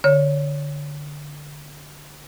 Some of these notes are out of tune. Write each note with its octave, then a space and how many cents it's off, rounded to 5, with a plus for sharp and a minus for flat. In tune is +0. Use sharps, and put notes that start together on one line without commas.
D3 +0 C#5 +0